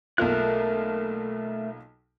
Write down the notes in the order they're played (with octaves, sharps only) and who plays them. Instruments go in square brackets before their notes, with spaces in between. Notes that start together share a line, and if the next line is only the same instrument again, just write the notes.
[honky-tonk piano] B1 A#3 F4 [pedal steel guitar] A3 A#4 F#6